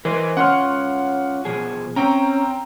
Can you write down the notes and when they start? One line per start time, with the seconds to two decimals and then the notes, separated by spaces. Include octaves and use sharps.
0.05 E3 A#4 C5 D#5
0.37 C#4 F4 C#5 F#5 C6 F6
1.45 B2 F3 G#4
1.96 C4 C#4 G5 A#5